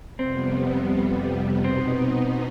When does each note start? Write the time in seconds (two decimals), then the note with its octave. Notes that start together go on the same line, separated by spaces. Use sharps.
0.19 F2 C3 G3 B3 C4
1.63 B2 B3 C4 D#4